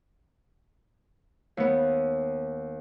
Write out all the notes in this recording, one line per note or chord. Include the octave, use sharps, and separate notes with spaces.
D#2 B3